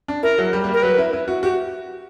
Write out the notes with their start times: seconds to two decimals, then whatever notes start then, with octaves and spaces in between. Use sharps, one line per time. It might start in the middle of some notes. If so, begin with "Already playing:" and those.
0.08 D4
0.23 E4 A#4
0.38 F#3
0.53 G3
0.64 A#3
0.69 G3
0.74 A#4
0.83 F#3 B4
0.98 E4
1.13 E4
1.28 F#4
1.43 F#4 G4